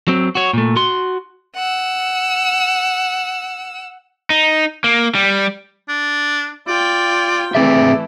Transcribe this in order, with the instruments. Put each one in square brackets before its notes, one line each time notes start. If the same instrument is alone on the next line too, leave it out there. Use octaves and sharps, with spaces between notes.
[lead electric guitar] F#3 C4
F#4 C#5
A#2 A3
F#4 C6
[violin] F#5 E6
[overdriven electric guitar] D#4
A#3
G3
[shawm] D4
[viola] F4 G5 [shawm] D5
[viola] E3 A3 [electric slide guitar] C4 G#4 E5 [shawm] D5